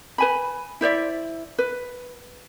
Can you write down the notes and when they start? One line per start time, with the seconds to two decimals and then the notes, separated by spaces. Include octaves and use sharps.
0.18 B4 G#5 B5
0.81 E4 C5 D5 E5
1.59 B4